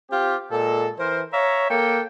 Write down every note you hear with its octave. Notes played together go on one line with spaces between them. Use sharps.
C4 F4 G4
A#2 G#3 A4
E3 A#4 C5
C#5 E5 F5 A#5
A#3 A4 G5